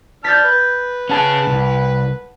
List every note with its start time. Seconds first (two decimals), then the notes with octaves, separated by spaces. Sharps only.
0.24 D4 A5 F6 G6 A6 B6
0.44 B4
1.09 C#4 G#4 F#5 A5 F#6
1.47 C2